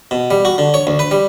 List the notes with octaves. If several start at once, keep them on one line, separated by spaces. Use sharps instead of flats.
B2
G3
F#4
D3
C#5
D2
B4
G3